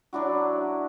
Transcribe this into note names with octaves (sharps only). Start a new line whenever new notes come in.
F#3 D4 E4 F#4